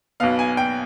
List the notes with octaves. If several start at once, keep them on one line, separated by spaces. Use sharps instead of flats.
B1 B2 B3 F5
G#5
G5